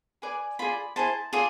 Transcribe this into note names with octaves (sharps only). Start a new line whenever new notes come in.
G#4 B4 D5 G#5
F4 G#4 D5 B5
E4 G#4 C5 A5
F4 G#4 D5